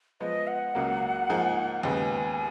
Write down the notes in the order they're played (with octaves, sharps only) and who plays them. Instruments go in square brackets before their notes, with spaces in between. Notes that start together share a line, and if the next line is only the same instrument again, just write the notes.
[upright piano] F3 G#3 B3 [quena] D#5
[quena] F#5
[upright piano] C#2 C#3 F#3 A#3
G#2 F3 A#3 D#4 G#4
[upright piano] D#2 C#3 G#3 B3 [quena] G#5